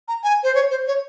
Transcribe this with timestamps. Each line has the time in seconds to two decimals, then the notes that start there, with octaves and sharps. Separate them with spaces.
0.08 A#5
0.24 G#5
0.43 C5
0.55 C#5
0.70 C5
0.87 C#5